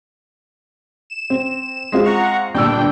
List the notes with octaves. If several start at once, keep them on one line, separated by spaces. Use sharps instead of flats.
E7
C4
G#3 C4 F4
F#5 A#5 C#6
G1 A#2 D4 G5 E6